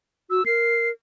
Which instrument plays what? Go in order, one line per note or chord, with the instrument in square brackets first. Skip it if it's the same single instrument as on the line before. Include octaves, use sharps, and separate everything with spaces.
[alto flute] F#4 [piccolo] E6
[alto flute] A#4 [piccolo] C7